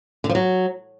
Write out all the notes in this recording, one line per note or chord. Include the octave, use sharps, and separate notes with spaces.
D3
F3
F#3